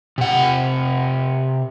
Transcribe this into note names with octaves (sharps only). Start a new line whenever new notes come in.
C3 F#5